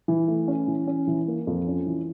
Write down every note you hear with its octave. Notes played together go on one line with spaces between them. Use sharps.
E3
A3
C#4
E3
C#4
E3
A#3
F2
C#4
E3